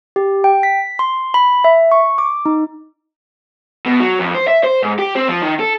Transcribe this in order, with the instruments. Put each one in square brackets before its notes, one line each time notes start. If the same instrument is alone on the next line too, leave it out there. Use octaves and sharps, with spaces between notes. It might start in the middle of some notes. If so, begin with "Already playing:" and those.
[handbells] G4
G5
B6
C6
B5
E5
C#6
D6
D#4
[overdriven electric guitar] B2
F#3
F2
C5
E5
C5
G#2
G4
C4
F3
D#3
A4